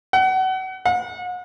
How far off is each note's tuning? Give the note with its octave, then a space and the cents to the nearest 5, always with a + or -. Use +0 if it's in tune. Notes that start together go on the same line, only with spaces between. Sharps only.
F#5 +30
F#5 -40